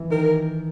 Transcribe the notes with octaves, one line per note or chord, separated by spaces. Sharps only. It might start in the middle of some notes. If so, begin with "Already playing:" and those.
Already playing: E3
D#3 A#4